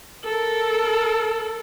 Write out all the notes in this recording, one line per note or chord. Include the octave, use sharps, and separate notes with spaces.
A4 A#4